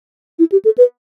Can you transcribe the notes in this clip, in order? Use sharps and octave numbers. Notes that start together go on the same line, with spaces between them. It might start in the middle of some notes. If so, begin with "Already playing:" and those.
E4
G4
A4
B4